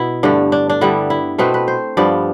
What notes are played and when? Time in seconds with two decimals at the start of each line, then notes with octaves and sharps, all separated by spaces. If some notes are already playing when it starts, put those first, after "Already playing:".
Already playing: B2 B3 E4
0.23 G2 D3 A3 D4
0.52 D4
0.70 D4
0.81 D3 G3 B3 E4
1.10 E4
1.38 B2 A3 C4 B4
1.54 B4
1.68 C5
1.97 G2 F3 B3 D5